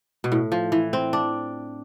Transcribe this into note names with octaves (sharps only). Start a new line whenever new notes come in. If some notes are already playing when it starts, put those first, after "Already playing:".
B2
A2
F3
E3
C4
D4